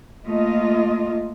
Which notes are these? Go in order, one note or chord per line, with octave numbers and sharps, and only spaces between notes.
A3 A#3 F4 D#5